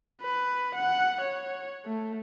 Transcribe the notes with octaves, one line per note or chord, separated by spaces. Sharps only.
B4
F#5
C#5
A3